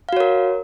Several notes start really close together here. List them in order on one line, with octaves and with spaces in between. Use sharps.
F5 F#4 C#5 A#4